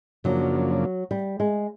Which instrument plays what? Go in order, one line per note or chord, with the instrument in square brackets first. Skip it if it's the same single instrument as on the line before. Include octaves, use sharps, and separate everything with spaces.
[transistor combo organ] F#2 C#3 F3 A#3 D4 [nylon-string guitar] F#3
[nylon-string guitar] G3
G#3